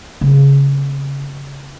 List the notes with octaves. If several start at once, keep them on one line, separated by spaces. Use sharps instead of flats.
C#3 C4